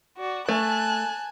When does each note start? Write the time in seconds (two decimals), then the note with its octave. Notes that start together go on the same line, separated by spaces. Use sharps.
0.18 F#4 D5
0.49 A3 G#5 A5 F#6